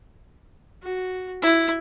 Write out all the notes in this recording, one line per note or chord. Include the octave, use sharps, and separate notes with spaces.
F#4
E4